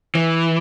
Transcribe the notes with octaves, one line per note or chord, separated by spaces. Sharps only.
E3